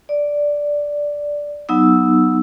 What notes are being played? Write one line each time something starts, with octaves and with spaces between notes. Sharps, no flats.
D5
F#3 B3 D#4 E6